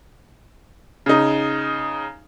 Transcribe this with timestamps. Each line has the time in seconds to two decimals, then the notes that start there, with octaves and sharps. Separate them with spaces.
1.06 C#3 D#4